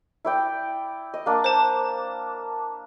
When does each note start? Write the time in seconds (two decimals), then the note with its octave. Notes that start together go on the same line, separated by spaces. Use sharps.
0.25 E4 D5 G5
1.14 D#5
1.26 A#3 D4
1.44 C5 A5